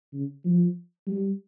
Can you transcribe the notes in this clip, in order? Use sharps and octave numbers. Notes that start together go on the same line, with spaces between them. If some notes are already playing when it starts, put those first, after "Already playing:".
C#3
F3
G3